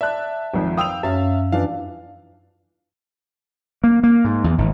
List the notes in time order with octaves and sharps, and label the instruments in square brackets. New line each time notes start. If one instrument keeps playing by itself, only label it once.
[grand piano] D5 F#6 [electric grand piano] E5 A5
[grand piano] G#1 F2
[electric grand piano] F5 G5 E6 [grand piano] D#6 F7
[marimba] F#2 [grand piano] C#4 [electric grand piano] E5 F5
[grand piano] E3 F3 D4 [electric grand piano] F5
[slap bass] A#3
A#3
G#2
E2
G#1